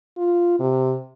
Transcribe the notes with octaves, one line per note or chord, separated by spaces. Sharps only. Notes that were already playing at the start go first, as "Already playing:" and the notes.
F4
C3